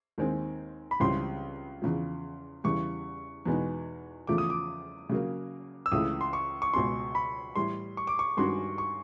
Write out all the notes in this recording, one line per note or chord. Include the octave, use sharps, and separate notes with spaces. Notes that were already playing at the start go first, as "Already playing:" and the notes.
D#2 D#3 G#3 C4
B5
C#2 C#3 E3 G3 C4 C6
E2 C#3 F3
E2 C#3 E3 G3 C#6
E2 B2 G#3 B3 D#4
E2 C#3 F3 A3 D6
D#6
D6
C#3 F#3 A#3
E6
C#2 C#3 E3 A3 D#6
C6
C#6
C#6
C#2 B2 G#3 C6
B5
A2 E3 G3 C6
C#6
D6
C#6
G2 D#3 G#3 C#4 F#4 C6
C#6